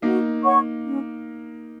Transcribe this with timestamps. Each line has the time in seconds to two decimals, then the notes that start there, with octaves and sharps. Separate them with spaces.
0.02 A#3 D#4 F#4
0.43 C#5 F#5 C#6
0.84 C#4